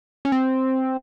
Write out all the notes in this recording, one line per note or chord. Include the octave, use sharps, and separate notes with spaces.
C#4
C4